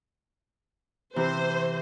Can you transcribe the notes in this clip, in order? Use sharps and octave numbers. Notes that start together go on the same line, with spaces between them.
C3 E3 C5